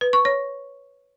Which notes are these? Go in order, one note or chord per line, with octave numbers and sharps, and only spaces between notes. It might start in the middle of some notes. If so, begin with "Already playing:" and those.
B4
C#6
C#5